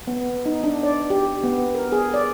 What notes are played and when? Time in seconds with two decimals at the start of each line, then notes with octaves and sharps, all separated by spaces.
0.07 B3
0.46 D#4
0.64 D4
0.83 D5
1.10 G4
1.43 B3
1.75 A#4
1.92 G#4
2.14 D5